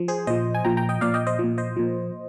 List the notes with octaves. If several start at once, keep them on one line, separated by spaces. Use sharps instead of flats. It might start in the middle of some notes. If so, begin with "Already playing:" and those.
Already playing: F3
G#4 C5
A#2 F3 C5 D#5
G#5
A#2 F3 G5 A#5
G5 A#5
D#5 G5
A#2 F3 D5 F5
D#5 G5
C5 D#5
A#2 F3
C5 D#5
A#2 F3